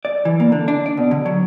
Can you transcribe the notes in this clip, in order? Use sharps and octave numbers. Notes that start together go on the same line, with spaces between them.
D5
E3
A#3
D3
D4
D5
B2
D3
F#3